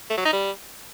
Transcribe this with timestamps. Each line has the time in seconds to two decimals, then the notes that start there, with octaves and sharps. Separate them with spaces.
0.10 A3
0.18 F#3
0.25 D#4
0.33 G3